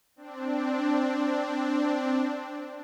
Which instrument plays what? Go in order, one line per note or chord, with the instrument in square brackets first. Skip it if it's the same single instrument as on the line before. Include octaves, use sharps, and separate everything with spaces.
[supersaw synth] C4 D4